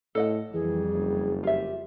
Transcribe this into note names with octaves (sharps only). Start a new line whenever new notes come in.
A2 A4 D#5 F#5
F2 E3 G3 G#4
F#1
F4 G4 E5